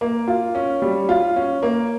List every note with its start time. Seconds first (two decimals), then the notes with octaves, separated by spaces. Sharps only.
0.01 A#3
0.28 F4
0.55 C#4
0.82 G3
1.09 F4
1.36 C#4
1.63 A#3